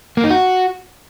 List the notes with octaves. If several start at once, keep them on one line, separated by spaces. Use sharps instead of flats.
A#3
D#4
F#4